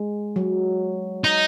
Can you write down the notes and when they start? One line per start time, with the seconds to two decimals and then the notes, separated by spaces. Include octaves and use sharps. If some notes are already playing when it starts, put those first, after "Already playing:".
Already playing: G#3
0.36 F#3
1.24 D#4